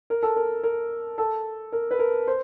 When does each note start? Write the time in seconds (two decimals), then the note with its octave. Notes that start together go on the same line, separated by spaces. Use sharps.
0.10 A#4
0.23 A4
0.36 A#4
0.63 A#4
1.18 A4
1.72 A#4
1.91 B4
1.99 A#4
2.27 C5